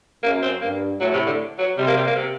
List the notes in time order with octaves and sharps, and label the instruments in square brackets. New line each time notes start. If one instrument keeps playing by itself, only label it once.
[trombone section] F#2 [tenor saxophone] A#3
[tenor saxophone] C4
[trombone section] G2 [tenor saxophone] A#3
[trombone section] A2 [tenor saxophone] F#3
[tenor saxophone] C3
D3
F#3
[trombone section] C3 [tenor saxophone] G3
[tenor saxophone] A#3
G3
A#3
C3